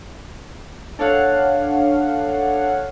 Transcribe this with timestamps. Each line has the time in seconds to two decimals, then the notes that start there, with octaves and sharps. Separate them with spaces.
0.99 D4 A4 C#5 F5 F#5